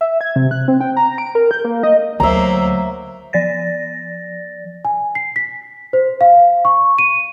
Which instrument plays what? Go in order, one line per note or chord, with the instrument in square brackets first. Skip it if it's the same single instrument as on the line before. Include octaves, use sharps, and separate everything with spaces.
[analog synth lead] E5
G#6
C3
F#6
C4
G5
A#5
D7
A#4
G6
A#3
D#5
[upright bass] D2 [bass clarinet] F#3 [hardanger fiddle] A#3 C5 [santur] E5 A#5
[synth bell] F3 D5 A6 A#6
[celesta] G#5
C7
B6
C5
F5
C#6
D#7